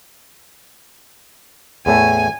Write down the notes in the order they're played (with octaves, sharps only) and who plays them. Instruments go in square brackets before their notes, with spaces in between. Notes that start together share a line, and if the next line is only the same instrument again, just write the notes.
[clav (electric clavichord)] E2 A2 A3 [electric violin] G#5